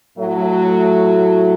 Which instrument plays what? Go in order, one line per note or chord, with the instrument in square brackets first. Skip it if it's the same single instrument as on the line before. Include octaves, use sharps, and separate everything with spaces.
[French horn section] A2 F#3 A3